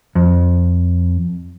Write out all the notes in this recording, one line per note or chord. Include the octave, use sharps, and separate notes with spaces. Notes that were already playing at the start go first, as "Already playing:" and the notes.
F2